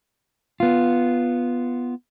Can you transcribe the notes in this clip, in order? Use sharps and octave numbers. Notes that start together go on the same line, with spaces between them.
B3 F4